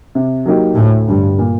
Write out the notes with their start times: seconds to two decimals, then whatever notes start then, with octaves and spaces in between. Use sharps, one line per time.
0.15 C3
0.46 F#3 A#3 D#4 G4
0.76 D2 A2
1.08 G2 D3 G3
1.39 A#2